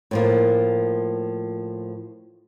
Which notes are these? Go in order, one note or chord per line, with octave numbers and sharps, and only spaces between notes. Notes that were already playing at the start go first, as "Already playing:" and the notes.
A2 F3 A#3